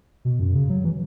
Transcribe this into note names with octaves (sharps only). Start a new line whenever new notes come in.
B2
F#2
C#3
F#3
E3